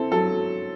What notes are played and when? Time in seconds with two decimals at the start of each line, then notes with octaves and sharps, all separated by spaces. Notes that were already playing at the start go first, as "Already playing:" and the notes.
Already playing: C4 E4 A4
0.11 F#3 A4